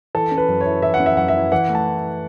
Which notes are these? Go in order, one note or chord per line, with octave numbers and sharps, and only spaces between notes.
E3 A4
C#4
B4
F#2
C#5
E4
E3 E5
F#5
C#4
E5
F#2 F#5
E5
E4
E3 F#5
A3
A5